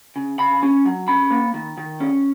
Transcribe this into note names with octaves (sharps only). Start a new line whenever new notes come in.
C#3
C#3 B5
C#4
F#3
C#4 B5
A#3
D#3
D#3
C#4